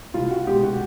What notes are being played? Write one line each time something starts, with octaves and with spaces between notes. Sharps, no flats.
C2 F4
F#4
B2 G#3 G4
F#4